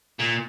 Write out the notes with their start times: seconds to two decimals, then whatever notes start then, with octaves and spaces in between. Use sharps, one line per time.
0.19 A#2